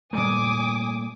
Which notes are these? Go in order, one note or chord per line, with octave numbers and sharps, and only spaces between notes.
A#2 G3 A3 G#5 D6 D#6